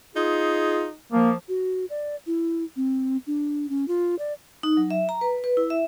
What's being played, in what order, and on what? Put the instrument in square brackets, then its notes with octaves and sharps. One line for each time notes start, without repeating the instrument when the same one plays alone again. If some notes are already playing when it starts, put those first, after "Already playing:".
[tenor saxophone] D#4 [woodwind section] F4 G#4
[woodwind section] F3 [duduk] A#3
[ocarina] F#4
D5
E4
C4
D4
C#4
F4
D5
[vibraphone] D#4
F#3
E5
A#5
B4
B4
E4
E5